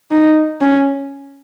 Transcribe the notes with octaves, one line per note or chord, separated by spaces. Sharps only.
D#4
C#4